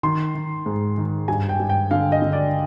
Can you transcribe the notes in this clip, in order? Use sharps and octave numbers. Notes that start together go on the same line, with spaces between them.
D#3 C6
D#3
G#2
D#3
G2 G#5
G5
G2
G5
D3 F5
D#5
D3
D5